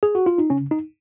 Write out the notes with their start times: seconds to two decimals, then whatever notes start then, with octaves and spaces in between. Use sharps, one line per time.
0.03 G#4
0.15 F#4
0.26 F4
0.38 D#4
0.50 C#3 C#4
0.71 D#4